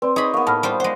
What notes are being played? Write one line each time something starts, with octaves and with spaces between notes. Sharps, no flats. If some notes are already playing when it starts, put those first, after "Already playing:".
C4 B4 D5 C6
D#4 G#4 C#5 B5
A#3 B3 F#5 C#6
A2 A5 B5 F6
G3 F4 C5
G#3 C5 F#5